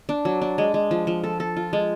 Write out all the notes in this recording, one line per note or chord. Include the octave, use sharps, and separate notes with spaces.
D4
F#3
D4
G#3
G#3
F3
F3
A4
A4
F4
G#3